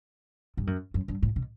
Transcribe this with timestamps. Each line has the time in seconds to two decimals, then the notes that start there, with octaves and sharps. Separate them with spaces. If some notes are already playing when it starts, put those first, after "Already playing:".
0.57 G2
0.67 F#2
0.94 F#2
1.08 G2
1.22 A2
1.36 B2